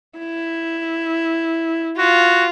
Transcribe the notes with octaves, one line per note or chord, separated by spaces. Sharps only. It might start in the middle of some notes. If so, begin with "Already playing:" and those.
E4
F4 F#4